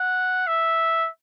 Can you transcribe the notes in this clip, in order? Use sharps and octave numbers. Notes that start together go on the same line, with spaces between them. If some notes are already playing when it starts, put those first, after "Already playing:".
Already playing: F#5
E5